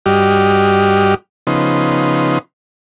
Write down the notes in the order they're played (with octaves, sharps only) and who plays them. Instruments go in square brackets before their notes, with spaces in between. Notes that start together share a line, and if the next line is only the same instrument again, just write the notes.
[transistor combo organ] G2 G3 F#4 G4 D#5 F6
C#3 F3 B3 D#4 C6